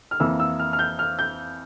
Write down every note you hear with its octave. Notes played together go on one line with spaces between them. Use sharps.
F6
F2 E3 A#3 E6
E6
F6
F6
G6
F6
G6